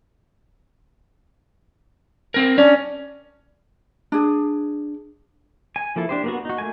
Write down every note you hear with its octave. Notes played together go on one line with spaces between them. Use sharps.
C4 A#4
C#4 D4
D4 G#4
G#5
F3 A#3 E4 A4
D4 G4 C5
A#3 B3 F#4
D#4 F#4
A3 A#3 G#5